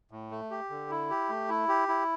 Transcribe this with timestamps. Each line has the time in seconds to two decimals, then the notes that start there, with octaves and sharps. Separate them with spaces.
0.11 A2
0.31 A3
0.51 G4
0.70 D3
0.90 E4
1.10 G4
1.29 A3
1.49 E4
1.68 G4
1.88 E4